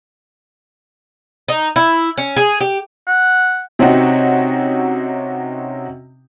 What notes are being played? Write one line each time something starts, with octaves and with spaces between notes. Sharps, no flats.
D#4
E4
C#4
G#4
G4
F#5
C3 C4 C#4 D#4 F#4